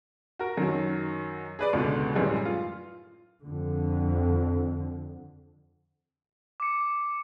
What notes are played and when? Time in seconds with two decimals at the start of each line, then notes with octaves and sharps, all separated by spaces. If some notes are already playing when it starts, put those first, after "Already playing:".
0.39 F#4 A#4
0.58 F#2 D#3 F#3
1.59 G#4 B4 D5
1.73 C#2 B2 D3
2.15 F#2 A2 E3 G3 G#3
2.45 F4
3.43 F2 D3
6.60 D6 C#7